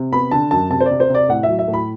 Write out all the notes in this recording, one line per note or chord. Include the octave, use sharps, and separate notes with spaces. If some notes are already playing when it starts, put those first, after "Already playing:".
Already playing: C3
B3 B5
D3 A5
F#2 A5
C3 A5
C5
C3 D5
C5
C3 D5
A2 F#5
F#3 E5
E5
A2
B5